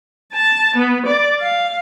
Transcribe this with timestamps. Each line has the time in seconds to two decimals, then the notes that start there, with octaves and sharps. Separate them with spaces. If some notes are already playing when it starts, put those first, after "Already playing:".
0.33 A5
0.76 B3
1.06 D5
1.40 F5